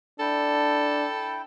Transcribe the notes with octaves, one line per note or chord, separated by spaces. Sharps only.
D4 E4 A4 G5